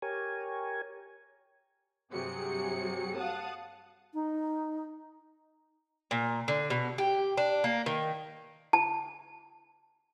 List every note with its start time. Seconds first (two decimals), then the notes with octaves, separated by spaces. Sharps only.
0.02 G4 A#4 C#5 G#5
2.12 G2 C3 F#3 G#4 C#7
3.16 F5 F#5 A5 D#6
4.14 D#4
6.11 A#2
6.48 D3
6.70 B2
6.98 G4
7.37 D4
7.64 A#3
7.86 D#3
8.73 A5